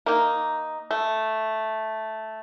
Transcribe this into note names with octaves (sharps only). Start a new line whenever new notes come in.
A#3 D#4
A3